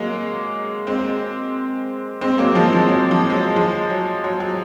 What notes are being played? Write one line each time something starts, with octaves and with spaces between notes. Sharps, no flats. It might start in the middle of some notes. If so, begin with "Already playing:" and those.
Already playing: F#3 G#3 A#3
G#3 C4
G#3 C4
F#3 A#3
F3 G#3
F3
F#3
F3
G#3
F#3
F3 G#3
F#3
F#3
F#3